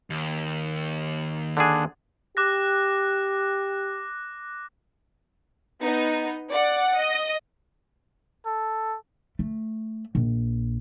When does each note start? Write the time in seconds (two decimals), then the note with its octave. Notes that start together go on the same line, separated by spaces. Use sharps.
0.10 D#2
1.57 D3 D4 G#4
2.37 G4 D6 F#6 A#6
5.82 B3 D#4
6.51 D5 F#5
6.97 D#5
8.46 A4
9.39 A3
10.15 A#1